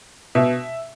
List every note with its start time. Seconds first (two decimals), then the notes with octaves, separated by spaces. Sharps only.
0.35 B2 E5